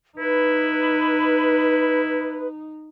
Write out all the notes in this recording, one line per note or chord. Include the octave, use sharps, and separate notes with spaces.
D#4 E4 B4